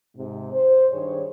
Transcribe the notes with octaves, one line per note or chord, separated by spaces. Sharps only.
G#2 C3
C5
G2 D#3 G#4 C#5